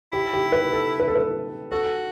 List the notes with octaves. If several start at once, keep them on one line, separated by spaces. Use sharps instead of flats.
E4 G4
G4
B4
A4
B4
A4
B4
F#4 A4